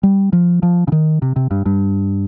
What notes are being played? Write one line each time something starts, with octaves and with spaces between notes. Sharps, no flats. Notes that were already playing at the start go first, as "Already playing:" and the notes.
G3
F3
F3
C#3
D#3
C3
C3
G2
G2